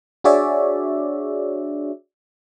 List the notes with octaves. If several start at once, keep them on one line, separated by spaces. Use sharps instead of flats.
D4 F#4 G#4 C#5 D5 E5